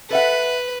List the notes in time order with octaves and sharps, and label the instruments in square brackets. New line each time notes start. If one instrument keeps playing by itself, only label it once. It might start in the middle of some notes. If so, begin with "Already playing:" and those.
[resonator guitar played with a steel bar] A4 E5 F#5 [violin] B4